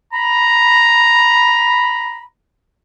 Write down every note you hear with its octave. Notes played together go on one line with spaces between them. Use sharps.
A#5 B5